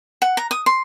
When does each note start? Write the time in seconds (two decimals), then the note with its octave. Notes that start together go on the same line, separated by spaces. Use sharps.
0.22 F#5
0.37 A#5
0.51 D#6
0.66 C6